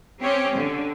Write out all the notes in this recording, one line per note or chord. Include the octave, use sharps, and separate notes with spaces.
C4 C#4 G4 C#5
D3